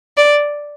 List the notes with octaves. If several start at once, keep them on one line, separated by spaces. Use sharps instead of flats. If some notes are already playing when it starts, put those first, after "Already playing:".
D5